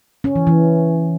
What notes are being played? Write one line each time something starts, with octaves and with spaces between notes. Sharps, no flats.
C#4
E3
E3